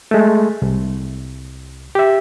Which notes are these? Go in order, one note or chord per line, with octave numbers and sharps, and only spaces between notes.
G#3 A3
C2
G4 E5